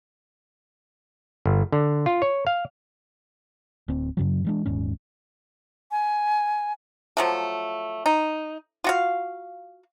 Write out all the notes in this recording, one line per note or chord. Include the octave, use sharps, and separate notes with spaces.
G1
D3
F4
C#5
F5
D1 C4
F#2 C#3 F#3
E3 G#3 D4
D#1 G#2 C#4
G#5
F3 F#3 A3
D#4
F4 F#4 F5